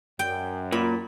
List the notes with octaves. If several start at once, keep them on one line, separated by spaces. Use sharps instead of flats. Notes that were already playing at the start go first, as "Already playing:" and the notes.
F#2 G5
A#2 B5